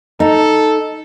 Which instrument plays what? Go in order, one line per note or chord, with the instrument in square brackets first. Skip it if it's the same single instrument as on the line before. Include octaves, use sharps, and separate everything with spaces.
[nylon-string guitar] D#4 [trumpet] A4